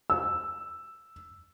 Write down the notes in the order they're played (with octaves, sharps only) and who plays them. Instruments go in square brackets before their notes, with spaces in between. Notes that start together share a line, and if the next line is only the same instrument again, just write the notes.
[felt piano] E6